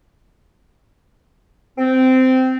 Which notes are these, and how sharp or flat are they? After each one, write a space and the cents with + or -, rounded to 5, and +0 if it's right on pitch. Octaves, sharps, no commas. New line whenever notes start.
C4 -15